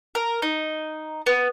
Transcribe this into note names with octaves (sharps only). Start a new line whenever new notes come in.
A#4
D#4
B3